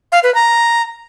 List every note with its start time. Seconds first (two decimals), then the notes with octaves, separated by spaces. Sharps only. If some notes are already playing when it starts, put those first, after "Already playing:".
0.12 F5
0.23 B4
0.35 A#5